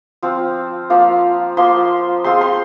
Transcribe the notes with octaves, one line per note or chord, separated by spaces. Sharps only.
F3 C4 F4
F3 A#3 F4
F3 A#3 F4 C6
G#3 C4 F4 C6
C6